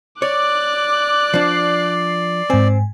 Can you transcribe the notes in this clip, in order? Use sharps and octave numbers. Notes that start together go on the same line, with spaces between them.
C#5 D5 D6 F#6
F3 D4 C7
G#2 C4 G#5